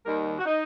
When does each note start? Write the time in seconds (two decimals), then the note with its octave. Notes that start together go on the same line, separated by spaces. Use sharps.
0.04 D#2 D#3 G3 A#4
0.39 F#4
0.46 D#4